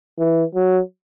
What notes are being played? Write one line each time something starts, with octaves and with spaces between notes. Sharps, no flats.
E3
F#3